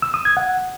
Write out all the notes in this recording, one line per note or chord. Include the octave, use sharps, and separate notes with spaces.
E6
D#6
G#6
F#5